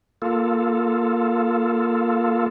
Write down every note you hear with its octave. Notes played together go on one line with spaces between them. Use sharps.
A#3 F4 A4